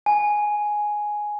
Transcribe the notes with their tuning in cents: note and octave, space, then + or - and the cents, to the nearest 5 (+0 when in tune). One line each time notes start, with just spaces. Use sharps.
G#5 +5